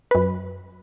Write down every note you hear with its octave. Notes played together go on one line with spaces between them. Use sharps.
F#2 B4